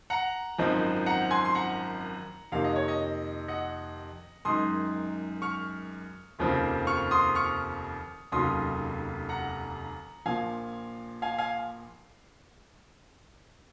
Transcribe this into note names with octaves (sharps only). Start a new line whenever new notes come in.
F#5 A#5
G#1 F#2 F3 C4 D#4
F#5 A#5
G#5 C6
C6
F#5 A#5
F2 C3 D#3 A#3 F5
D#5
C#5
D#5
D#5 F#5
F#2 D#3 G#3 D#4 C6 D#6
C#6 F6
F1 D#2 C#3 F3 C4
C#6 F6
C6 D#6
C#6 F6
F1 D#2 C#3 F#3 C6 D#6
F#5 A#5
A#1 A#2 F3 F5 G#5
F5 G#5
F5 G#5